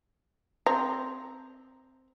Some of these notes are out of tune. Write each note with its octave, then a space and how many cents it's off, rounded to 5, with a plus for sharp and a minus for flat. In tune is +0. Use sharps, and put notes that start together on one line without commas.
C4 +0 A#5 +0